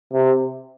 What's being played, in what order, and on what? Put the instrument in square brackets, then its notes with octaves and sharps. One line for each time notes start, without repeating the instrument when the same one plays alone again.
[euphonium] C3